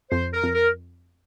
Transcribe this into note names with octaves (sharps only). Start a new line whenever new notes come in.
F2 C5
A#4
F2
A#4